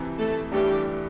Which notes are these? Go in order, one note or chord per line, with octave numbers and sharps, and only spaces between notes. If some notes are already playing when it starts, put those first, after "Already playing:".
Already playing: F2 C3 E3
A3 A4
G2 E3 G3 A3 D4 G4